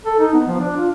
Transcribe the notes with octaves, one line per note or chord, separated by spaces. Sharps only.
A4
D#4
B3
F3
D4
F4